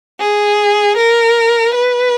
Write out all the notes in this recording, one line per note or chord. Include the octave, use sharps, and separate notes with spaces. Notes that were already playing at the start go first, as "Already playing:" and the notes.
G#4
A#4
B4